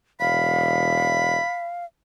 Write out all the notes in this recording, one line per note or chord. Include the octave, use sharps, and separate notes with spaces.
E1 F5 B5